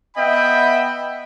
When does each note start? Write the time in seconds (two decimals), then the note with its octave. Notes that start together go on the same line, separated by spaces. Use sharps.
0.16 B3 D#5 E5 G5 B5